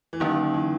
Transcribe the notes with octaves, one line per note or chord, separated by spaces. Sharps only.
E3
D3 D#3 F#3 A#3 C#4
E3